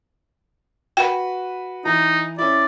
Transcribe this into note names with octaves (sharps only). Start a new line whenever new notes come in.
F#4 B4 G5
E3 D#4 A#5
C#4 E4 D5